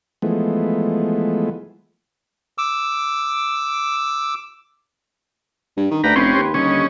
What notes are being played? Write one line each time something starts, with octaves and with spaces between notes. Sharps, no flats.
E3 F3 G#3 A3 B3
D6 E6
G2
D#3
D2 G4 B4 A#5
F1 C4 C#4 G4 B4 C6
D#2
D3 G3 C#4 D#4